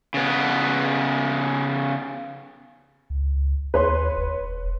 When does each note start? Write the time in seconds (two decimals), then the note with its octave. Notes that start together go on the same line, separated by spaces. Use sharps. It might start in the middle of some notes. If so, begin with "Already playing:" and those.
0.14 C#3 B3
3.10 C#2
3.74 D#2 B4 C#5 C6
4.16 E1